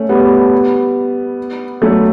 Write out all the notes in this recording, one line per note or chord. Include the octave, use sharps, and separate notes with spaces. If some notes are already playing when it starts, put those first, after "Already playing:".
Already playing: A3 C#4
G3 B3
F#3 A3